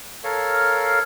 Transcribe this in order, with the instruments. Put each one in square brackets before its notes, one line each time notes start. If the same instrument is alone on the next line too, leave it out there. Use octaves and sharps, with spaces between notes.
[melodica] A4 A#4 C#5 F5